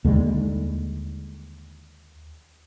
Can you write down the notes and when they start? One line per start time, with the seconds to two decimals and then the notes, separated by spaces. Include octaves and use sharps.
0.04 D#2 D3 G3 G#3